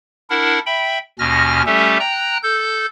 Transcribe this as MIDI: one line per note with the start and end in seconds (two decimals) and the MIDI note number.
0.30 0.59 62
0.30 0.59 64
0.30 0.59 70
0.30 0.59 78
0.66 0.98 76
0.66 0.98 79
0.66 0.98 83
1.19 1.62 39
1.19 1.62 47
1.19 1.62 61
1.19 1.62 89
1.19 1.62 94
1.66 1.98 55
1.66 1.98 57
1.66 1.98 61
1.66 1.98 67
1.66 1.98 69
1.66 1.98 76
2.00 2.38 79
2.00 2.38 82
2.00 2.38 90
2.43 2.86 69
2.43 2.86 91